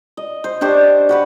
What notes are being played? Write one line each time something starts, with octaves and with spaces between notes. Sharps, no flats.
D#5
C5
D4 G4 C5 C#6
F#4 B4 F#5